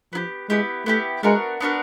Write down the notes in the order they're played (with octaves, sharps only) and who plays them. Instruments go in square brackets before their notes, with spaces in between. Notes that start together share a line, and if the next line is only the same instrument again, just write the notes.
[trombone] F3 [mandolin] B3 E4 G4
[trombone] G#3 [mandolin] B3 E4 G4
[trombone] A3 [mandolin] B3 E4 G4
[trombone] G#3 [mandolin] B3 D4 F#4 A#4
[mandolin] B3 D4 F#4 A#4